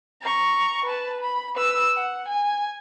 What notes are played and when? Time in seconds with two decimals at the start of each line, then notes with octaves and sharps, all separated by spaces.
0.22 A#5 C#6
0.85 B4 A5
1.21 B5
1.55 B4 E6
1.95 F#5
2.28 G#5